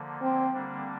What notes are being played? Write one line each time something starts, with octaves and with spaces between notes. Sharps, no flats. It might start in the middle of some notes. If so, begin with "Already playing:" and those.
Already playing: D3 F3 A#3
C4
D3 G3 A#3 D4